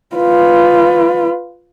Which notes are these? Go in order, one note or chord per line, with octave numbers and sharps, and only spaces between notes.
F4 B4